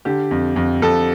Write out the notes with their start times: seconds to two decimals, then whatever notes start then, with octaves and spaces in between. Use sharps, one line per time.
0.05 D3 G4
0.31 F2
0.56 F2
0.82 F2 A4